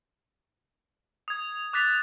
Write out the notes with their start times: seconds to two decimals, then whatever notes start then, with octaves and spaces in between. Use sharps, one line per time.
1.28 D#6 G#6
1.73 D6 F#6 A6 B6 F7